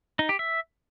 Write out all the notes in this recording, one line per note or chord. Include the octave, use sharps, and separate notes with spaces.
D#4
G4
E5